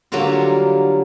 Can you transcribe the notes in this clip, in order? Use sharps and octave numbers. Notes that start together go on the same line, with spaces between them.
D3 F#3 G3 A#3 F4 F#4